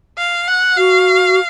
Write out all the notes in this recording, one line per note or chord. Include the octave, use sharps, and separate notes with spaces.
F5
F#5
F#4 F5